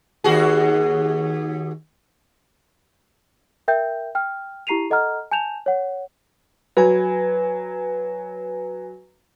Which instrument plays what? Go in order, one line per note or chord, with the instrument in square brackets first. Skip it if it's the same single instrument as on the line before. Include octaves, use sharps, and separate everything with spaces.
[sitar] D#2 F#4 G#4
[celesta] A#4 E5 G5 G6
G5 F6
E4 G4 A#5 C7 D#7 F7
A4 D#5 F#5 A#5 F6
G#5 A5 G6 E7 F7
C#5 F#5
[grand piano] F#3 [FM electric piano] B4 G#5